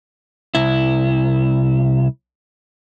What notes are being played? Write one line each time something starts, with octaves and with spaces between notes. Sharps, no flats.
C2 E4